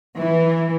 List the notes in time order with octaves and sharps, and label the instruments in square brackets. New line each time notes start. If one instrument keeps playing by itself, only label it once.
[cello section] E3